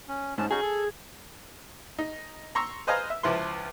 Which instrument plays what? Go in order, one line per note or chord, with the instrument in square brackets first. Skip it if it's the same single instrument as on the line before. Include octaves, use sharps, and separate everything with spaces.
[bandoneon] C#4
[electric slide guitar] G#2 [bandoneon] C#4 A5
[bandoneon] C#4 D#4 F#4 [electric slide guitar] G#4
[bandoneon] A4
[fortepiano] D#4
A#5 C6 C#6 E6
B4 C5 D#5 F5 G#5 A#5
E5
C#2 F3 E4 B4 C6